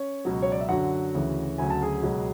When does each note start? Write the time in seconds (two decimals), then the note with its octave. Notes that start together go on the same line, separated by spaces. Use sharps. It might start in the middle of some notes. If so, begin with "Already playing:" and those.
Already playing: C#4 C#5
0.25 C#2 B2 F#3
0.42 C#5
0.52 D5
0.61 E5
0.68 F#2 D3 F#3 F#4 F#5
1.14 D2 C#3 E3
1.58 D2 C#3 F#3 G#5
1.70 A5
1.82 G#4 G#5
2.03 C#2 B2 F#3